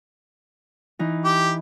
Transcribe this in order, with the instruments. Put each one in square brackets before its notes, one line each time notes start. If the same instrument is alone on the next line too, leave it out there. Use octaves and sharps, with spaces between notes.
[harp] E3 D#4
[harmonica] G4